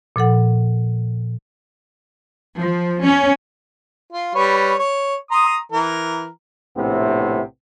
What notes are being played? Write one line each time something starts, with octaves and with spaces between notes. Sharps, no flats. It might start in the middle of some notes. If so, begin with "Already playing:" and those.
A#2 F3 A4 F#5
F3
C#4
F4
G3 B4 C#5
C#5
A#5 C6 D#6
E3 A#4
A#1 A2 C3 B3 C4